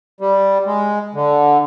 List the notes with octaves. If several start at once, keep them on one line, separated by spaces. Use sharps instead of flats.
G3
G#3
D3